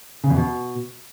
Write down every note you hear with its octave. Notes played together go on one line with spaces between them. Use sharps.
C#3
E2
B2